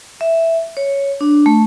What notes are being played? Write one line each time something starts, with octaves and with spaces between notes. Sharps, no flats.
E5
C#5
D4
A3